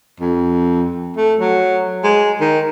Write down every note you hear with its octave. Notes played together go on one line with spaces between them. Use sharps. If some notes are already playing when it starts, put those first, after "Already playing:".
F2
A3
F#3
G#3
D#3